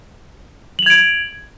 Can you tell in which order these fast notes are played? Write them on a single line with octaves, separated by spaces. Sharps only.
F#7 F7 G#6 D7